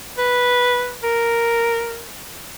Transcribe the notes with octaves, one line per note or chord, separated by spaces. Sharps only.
B4
A#4